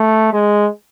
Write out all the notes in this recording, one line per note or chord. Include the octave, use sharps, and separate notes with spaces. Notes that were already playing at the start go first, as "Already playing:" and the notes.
Already playing: A3
G#3